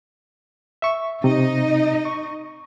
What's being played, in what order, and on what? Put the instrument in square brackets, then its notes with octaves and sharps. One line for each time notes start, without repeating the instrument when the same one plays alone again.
[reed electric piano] E5 C#6
[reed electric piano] C3 [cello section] D#4 D#5
[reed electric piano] C#6